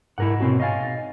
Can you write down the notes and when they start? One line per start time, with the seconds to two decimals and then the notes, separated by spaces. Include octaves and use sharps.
0.18 G#2 E4 A#4 F#5
0.40 B2 C4 C#4 F#4
0.60 D#5 F5 G#5 C#6 A6
0.83 A6